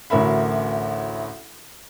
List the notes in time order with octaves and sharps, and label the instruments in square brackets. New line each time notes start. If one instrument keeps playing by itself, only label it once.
[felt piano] A1 D2 F#4 A#4 E5 B5